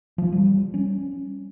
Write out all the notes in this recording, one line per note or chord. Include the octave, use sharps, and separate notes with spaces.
F3
G3
C#4